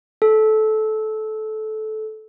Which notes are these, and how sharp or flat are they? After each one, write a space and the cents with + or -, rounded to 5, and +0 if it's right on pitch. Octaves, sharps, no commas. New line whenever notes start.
A4 -20